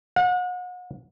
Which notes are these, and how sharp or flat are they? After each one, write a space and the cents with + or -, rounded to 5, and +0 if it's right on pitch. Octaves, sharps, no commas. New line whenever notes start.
F#5 -40